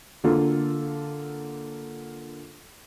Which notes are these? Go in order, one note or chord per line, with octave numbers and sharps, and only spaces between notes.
D3 A#3 F4 A4